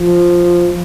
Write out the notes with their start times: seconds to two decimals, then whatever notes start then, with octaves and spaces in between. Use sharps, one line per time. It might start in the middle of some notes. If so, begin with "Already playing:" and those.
Already playing: F3